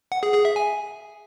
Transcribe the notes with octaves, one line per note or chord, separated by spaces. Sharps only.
F#5
G#4
G#4
E5
G#5